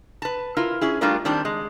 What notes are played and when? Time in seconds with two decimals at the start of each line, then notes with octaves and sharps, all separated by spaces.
0.22 B4 A5
0.57 E4 F4 A#4
0.81 C#4 E4 G#4
1.01 G3 A3 D4 F4 A#4 D5
1.25 D#3 G3 C4 D4
1.45 G#3